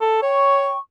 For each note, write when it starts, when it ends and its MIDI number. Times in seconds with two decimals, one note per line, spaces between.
0.01 0.22 69
0.22 0.73 73
0.22 0.77 79
0.22 0.77 85